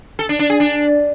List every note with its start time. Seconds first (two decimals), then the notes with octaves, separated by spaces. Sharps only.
0.19 A4
0.29 D4
0.39 D4
0.50 G#4
0.60 D4